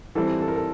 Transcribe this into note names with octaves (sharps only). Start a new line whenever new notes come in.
E3 G3 C4 A4
A4
A#4
A4